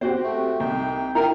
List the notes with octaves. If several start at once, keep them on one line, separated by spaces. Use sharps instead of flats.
C4 F#4 G4 C5
A3
C2 D#4 G5
D4 E4 A#4 G5 A#5